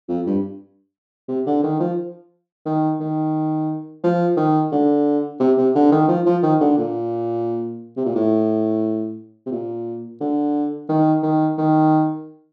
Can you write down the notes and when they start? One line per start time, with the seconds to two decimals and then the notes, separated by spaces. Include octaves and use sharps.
0.09 F2
0.26 G2
1.28 C3
1.46 D3
1.63 D#3
1.80 F3
2.66 D#3
3.00 D#3
4.04 F3
4.37 D#3
4.72 D3
5.40 C3
5.57 C3
5.75 D3
5.92 D#3
6.08 F3
6.26 F3
6.43 D#3
6.61 D3
6.77 A#2
7.97 C3
8.05 A#2
8.15 A2
9.46 C3
9.51 A#2
10.20 D3
10.89 D#3
11.23 D#3
11.58 D#3